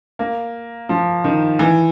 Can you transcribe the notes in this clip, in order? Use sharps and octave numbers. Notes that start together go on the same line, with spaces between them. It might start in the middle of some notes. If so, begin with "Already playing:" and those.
A#3
F3
D#3
E3